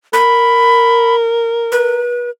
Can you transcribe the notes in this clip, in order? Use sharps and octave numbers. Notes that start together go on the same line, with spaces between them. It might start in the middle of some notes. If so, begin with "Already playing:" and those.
A#4 B5
B4